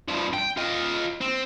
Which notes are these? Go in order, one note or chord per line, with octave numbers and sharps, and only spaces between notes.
G2 F3
G5
F4 D#5
C4